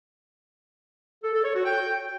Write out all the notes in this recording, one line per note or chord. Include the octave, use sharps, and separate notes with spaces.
A4
A4
C#5
F#4
G5